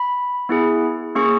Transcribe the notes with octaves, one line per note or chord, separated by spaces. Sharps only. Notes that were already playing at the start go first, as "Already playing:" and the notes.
Already playing: B5
B3 E4 G#4
A#3 C#4 G#4 C#6